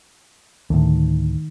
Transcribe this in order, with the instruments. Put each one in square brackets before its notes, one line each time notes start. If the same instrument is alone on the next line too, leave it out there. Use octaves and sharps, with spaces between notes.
[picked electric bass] D2 A2 [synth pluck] D#3